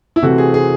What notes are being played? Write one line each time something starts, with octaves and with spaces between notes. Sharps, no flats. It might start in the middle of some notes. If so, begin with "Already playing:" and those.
E4
C3 E3 A3 C4 F#4
G#4
G#4